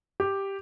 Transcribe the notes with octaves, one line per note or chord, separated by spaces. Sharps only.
G4